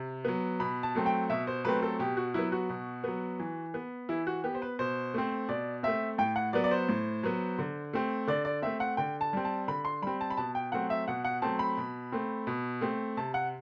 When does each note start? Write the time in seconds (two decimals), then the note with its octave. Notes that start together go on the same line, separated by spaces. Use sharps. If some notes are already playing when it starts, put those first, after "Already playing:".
Already playing: C3
0.25 F#3 B3
0.60 B2 B5
0.83 A5
0.95 F#3 A3 C4
1.06 G5
1.29 B2 E5
1.47 C5
1.65 F#3 A3 C4 B4
1.83 A4
1.99 B2 G4
2.17 F#4
2.34 F#3 B3 E4
2.52 F#4
2.69 B2
3.04 F#3 B3
3.40 E3
3.74 B3
4.09 E3 E4
4.27 F#4
4.44 B3 G4
4.55 C5
4.62 B4
4.79 B2 C5
5.14 A3 C4
5.49 B2 D5
5.83 A3 C4 E5
6.18 A2 G5
6.36 F#5
6.53 F#3 B3 D5
6.64 D5
6.71 C5
6.89 A2
7.23 F#3 B3
7.59 D3
7.93 A3 C4
8.27 D3 D5
8.45 D5
8.62 A3 C4 E5
8.80 F#5
8.97 D3 G5
9.21 A5
9.33 G3 C4
9.45 A5
9.68 D3 B5
9.85 C6
10.02 G3 C4 B5
10.21 A5
10.30 B5
10.37 B2 A5
10.55 G5
10.72 F#3 A3 C4 F#5
10.90 E5
11.08 B2 F#5
11.25 F#5
11.42 F#3 A3 C4 A5
11.59 B5
11.77 B2
12.12 A3 C4
12.47 B2
12.81 A3 C4
13.17 C3 A5
13.34 F#5